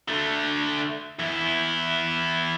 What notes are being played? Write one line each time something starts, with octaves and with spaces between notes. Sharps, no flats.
D3 A3
E2 E4